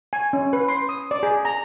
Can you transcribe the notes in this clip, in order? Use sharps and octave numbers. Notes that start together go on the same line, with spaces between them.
G#5
C#4
B4
C6
D#6
D5
G#4
A#5